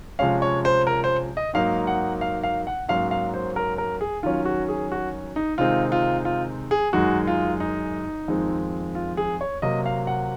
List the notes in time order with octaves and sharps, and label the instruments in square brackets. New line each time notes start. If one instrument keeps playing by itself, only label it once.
[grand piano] C3 F3 G#3 C#4 F5
C#5
C5
A#4
C5
D#5
G#2 F#3 A#3 D#4 F5
F#5
F5
F5
F#5
G#2 F#3 A#3 C#4 F5
F5
C5
A#4
A#4
G#4
D#3 F#3 C#4 F4
F#4
G#4
F#4
D#4
C3 D#3 G#3 C4 D#4 F4
F4
F4
G#4
F#2 D#3 G#3 D#4 F#4
F4
D#4
F2 D#3 G#3 C4
F4
G#4
C#5
C3 F#3 A#3 D#5
F5
F#5